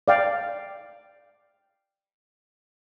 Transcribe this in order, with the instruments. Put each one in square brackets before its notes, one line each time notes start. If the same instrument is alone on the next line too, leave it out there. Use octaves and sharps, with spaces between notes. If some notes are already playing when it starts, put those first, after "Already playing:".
[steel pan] D5 F5 G5